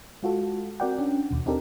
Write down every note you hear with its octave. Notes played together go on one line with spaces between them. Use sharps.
G#3 F4 F#4 A4
C4 F#4 A#4 D5 F#5 G5
C#4 D4
D#2 B2
C4 D4 D#4 G4 A4 A#4